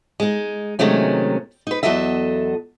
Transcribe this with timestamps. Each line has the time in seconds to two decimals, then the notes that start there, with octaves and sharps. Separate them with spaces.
0.20 G#3 D#4
0.79 C3 D#3 F#3 G#3 A3 C#4
1.67 D#4 B4
1.83 E2 E3 F#3 A4 D#5 E5